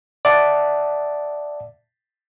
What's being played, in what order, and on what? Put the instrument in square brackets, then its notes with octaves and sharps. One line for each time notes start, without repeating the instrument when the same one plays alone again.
[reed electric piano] D5 E5 F#5 A5